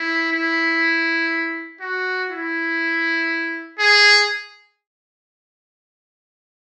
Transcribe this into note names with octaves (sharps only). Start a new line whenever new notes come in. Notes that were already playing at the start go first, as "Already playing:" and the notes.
Already playing: E4
E4
F#4
E4
G#4